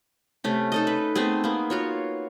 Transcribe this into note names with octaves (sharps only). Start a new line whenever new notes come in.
C3 A3 C#4
D#4 A4 D#5
B4
A3 B3 C4 G#4
A#3 B3
F4 F#4 C#5